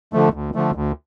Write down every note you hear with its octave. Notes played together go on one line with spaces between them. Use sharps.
D3 F3 A3
D2
D3 F3 A3
D2